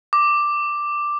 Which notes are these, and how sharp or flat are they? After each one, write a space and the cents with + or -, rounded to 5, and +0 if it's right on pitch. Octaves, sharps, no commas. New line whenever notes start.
D6 +5